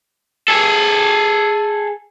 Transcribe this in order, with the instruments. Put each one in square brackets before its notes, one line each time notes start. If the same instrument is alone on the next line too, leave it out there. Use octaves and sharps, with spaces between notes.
[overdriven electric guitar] G#4 A4